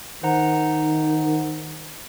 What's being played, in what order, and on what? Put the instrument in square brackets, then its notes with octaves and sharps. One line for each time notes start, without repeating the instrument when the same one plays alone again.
[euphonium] D#3 [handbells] C5 F#5 A#5